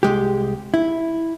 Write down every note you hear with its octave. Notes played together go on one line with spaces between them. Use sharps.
C2 G#3 G4
E4